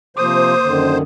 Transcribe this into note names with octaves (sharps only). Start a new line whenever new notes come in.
C3 F3 A#3 C5 D#6
F#2 D3 D#3